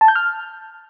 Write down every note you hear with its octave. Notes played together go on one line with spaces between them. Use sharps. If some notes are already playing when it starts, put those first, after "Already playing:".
A5
G6
F6